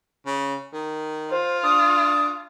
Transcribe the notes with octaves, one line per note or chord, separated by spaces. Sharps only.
C#3
D#3
F4 C5
D4 D#6